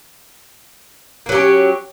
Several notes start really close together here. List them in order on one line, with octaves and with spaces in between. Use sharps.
A#3 F#3 G4 C#4